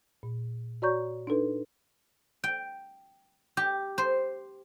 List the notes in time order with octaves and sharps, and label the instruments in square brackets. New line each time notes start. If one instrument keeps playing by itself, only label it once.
[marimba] A#2
F#4 C#5 D5 A#5 C#6 G6
D4 D#4 A4 B4
[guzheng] G5
G4
C5